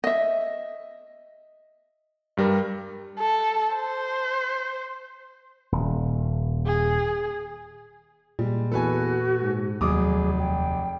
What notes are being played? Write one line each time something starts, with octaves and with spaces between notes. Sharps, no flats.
D#5 E5
G2 G3 A#4
A4
C5
D#1
G#4
A#2 G3 G#3
E2 F#4 A4 B4 G#5
G#2
F1 D#2 F#3 G#4 D6 D#6
G5